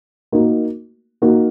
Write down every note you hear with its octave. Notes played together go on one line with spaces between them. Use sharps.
A#3 D#4 F#4 A#4
A#3 D#4 F#4 A#4